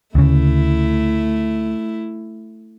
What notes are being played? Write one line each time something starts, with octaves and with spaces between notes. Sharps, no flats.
D2 C#3 A3 E4